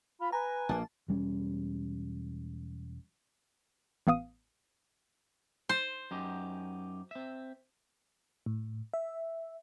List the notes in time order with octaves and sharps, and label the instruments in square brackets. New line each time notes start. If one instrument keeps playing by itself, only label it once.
[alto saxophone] F4 [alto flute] B5
[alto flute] B4 [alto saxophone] G#5 [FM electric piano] A#5 B5
[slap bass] A#1 A#3 [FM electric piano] A5
[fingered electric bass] E1 G3 C#4
[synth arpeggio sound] A1 B3 F5 D#6 D#7
[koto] C5
[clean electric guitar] F#2 D#4 G4
C4 E5
[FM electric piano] A2
E5